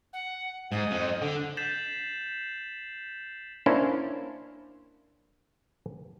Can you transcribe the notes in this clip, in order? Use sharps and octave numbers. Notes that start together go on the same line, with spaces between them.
F#5
G#2 D#5
F2
D3
G6 A6 B6 C7 E7 F#7
A#3 C#4 D4 E4 C5